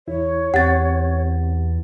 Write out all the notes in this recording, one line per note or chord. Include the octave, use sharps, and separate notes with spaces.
E2 E4 C#5
E2 C4 G4 F#5 A6